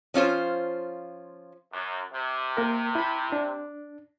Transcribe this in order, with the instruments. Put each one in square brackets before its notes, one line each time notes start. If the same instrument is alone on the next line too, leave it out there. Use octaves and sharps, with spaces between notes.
[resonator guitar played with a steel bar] F3 C#4 F4 C5
[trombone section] F#2
C3
[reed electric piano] A#3 A#4
E4 B5
D4